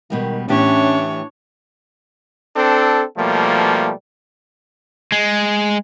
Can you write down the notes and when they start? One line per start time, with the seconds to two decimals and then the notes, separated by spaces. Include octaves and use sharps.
0.10 B2 D#3 G3 G#3
0.49 A2 E3 C#4 D4 G4 C#5
2.56 C4 D4 A4
3.17 B2 F3 G3 A3 A#3
5.12 G#3